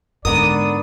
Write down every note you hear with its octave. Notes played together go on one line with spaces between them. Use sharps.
G#2 D3 B3 A#4 D5 D#6